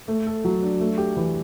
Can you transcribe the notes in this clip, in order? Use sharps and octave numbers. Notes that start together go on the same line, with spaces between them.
A3
A4
F#3
D4
A3
G4
E3